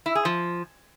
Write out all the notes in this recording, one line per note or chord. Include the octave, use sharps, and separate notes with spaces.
E4
G#4
F3